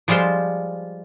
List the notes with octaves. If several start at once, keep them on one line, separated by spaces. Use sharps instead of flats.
F3 G3 G#3 F4 C5